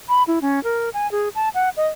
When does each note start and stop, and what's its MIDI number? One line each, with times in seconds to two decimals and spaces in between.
0.09 0.23 83
0.27 0.39 64
0.42 0.62 61
0.64 0.90 70
0.94 1.10 80
1.12 1.29 68
1.35 1.49 81
1.54 1.69 78
1.77 1.88 75